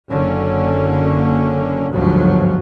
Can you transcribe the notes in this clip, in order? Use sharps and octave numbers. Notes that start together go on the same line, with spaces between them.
F#1 D3 A#3 C#4
G1 D2 G#2 F3 F#3